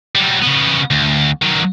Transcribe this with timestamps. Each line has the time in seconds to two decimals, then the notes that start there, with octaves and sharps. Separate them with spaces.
0.15 F#3 G3
0.42 C#3 B3
0.91 D2
1.42 D#3 F#3